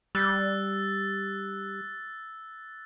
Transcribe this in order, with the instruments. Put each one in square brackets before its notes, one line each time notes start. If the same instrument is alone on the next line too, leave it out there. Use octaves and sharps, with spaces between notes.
[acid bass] G3 [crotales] E6 F#6 A6